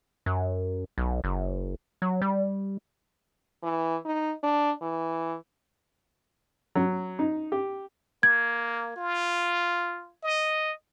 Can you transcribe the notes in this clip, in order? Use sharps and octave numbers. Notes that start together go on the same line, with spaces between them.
F#2
B1
F#1
F#3
G3
E3
D#4
D4
E3
F#3
D#4
G4
A#3 G#6
F4
D#5